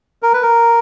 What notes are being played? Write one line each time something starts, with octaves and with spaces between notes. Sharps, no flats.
A#4
B4
A#4